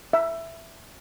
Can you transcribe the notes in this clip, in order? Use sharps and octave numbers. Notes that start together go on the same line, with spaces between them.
E5